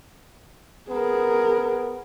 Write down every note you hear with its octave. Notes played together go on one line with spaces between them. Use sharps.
B3 G#4 A#4